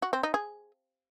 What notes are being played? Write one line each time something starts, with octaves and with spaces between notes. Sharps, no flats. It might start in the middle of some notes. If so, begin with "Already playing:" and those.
F#4
C4
D#4
G#4